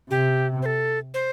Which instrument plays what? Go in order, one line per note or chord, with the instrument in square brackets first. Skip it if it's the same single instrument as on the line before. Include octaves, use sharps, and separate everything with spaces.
[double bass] C3 [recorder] G4
[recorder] C5
A4
C5